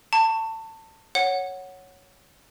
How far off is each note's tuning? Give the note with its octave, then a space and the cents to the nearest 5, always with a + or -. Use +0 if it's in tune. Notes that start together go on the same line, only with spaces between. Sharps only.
A5 +25 C#6 +0
C#5 +0 F#5 +0